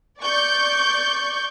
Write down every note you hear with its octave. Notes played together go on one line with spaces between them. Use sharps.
D5 C#6 G6